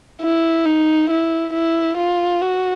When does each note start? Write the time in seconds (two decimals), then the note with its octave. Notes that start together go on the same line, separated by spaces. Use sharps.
0.22 E4
0.66 D#4
1.10 E4
1.53 E4
1.98 F4
2.41 F#4